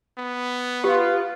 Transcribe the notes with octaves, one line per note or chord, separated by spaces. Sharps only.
B3
F4 G4 B4